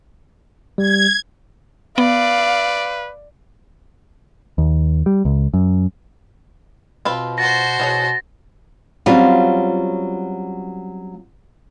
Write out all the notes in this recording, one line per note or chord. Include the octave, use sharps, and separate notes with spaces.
G3 G#6
B3 B4 D5 F5
D#2
G3
C#2
F#2
B2 C4 F4 B4
F#4 C5 A6 A#6
B2 E3 G#4 C#5
F#3 G3 C4 C#4 F4 F#4